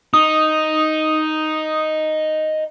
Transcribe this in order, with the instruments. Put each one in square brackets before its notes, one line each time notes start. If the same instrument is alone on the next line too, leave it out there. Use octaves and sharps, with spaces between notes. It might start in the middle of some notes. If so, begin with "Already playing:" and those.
[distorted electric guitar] D#4 [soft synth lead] D#6